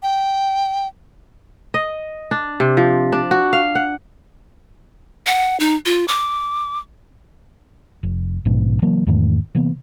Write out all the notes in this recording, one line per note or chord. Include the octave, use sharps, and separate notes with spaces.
G5
D#5
D4
C3
F3
D4
F#4
F5
F#5
F#5
D#4
F4
D6
F1
A#1 G#2 B2
C#3 E3 F#3 A#3
E2 G#2 D#3 A3
C3 E3 A#3 B3